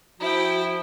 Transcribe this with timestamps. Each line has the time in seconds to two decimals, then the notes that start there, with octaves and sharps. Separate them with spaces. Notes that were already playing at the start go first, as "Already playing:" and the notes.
0.20 F3 E4 F#4 G5